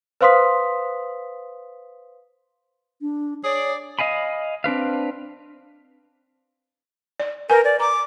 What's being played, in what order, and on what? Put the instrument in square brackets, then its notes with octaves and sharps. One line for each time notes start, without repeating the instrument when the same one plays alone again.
[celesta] B4 C5 F5 C6 D#6 B6
[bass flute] D4
[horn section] G#4 D5 [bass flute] C#5
[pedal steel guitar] D#5 F5 G#5 B5
C4 D4 B4 F5
[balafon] D5
[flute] A#4 [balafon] B4 G#5
[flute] D5
[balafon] A#5 [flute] D6